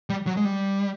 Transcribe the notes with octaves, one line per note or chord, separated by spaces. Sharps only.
G3
F#3
G#3
G3